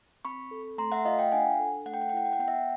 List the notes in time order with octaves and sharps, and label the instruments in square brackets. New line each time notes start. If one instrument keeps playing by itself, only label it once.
[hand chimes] C4 B5 C#6
A4
A3 A#5 C6
E5 F#5
F4 D#5 F5
F5 G5
D4 F#5 G#5
A4
A3 F#5
G5
F#5
G5
E4 F#5
G5
F#5
B3 G5
E5 F#5